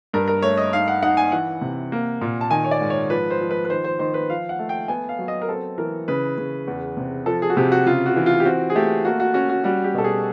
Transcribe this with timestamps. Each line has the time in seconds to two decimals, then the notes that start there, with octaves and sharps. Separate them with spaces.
0.14 G2 A#4
0.28 A#4
0.42 A3 C#5
0.57 D#5
0.73 D#4 F5
0.88 F#5
1.03 D#4 F#5
1.17 G#5
1.32 E3 F#5
1.61 C3
1.92 A#3
2.21 A#2
2.41 A5
2.51 D#3 G#5
2.64 C#5
2.71 D5
2.81 G#2
2.90 C#5
3.10 F3 B4
3.30 C5
3.41 F3
3.51 B4
3.65 B4
3.70 D#3 C5
3.84 C5
3.99 D#3 C5
4.14 B4
4.30 F3 F5
4.49 F#5
4.59 A3
4.69 G5
4.88 B3 G#5
5.09 F5
5.19 F#3
5.28 D#5
5.42 A#4
5.48 C4 A4
5.78 E3 A#4
6.08 C#3 B4
6.38 C#3
6.67 E2
6.97 C3
7.26 F3 A4
7.42 G#4
7.50 F#4
7.57 C3 G4
7.72 F#4
7.86 C#3 F4
8.06 F#4
8.16 E3
8.26 F4
8.40 G4
8.45 C4 F#4
8.70 G#4
8.75 A3 G4
9.05 A#3 F#4
9.20 F#4
9.34 C#4 F#4
9.49 F#4
9.64 G3 F#4
9.84 G4
9.94 B2 A4
10.04 G#4